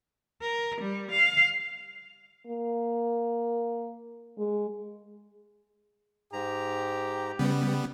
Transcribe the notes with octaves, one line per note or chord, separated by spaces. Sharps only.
A#4
G3
F5
A#3
G#3
G#2 G4 A#5
C#3 G3 B3